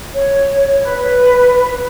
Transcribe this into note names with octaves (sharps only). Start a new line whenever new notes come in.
C#5
B4